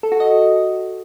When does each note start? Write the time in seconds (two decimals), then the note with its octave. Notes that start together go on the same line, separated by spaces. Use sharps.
0.03 A4
0.12 F#4
0.20 D#5